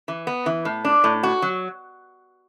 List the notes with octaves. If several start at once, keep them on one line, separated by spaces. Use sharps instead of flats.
E3
B3
E3
A2
D4
A2
F#4
F#3